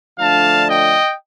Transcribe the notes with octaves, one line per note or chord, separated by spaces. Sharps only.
D3 F3 A3 D4 F5 A5
D#5 G5